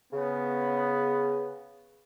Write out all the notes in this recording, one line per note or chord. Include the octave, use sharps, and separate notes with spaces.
C#3 B3